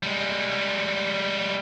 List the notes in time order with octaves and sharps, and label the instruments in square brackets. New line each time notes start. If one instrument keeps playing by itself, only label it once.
[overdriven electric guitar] G3 G#3